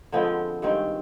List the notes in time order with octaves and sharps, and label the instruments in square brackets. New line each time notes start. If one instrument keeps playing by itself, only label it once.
[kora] D3 F3 G#3 B3 C4
G2 D#3 G#3 C4